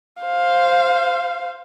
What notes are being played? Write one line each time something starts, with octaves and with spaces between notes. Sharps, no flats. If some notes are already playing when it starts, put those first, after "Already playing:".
C5 F5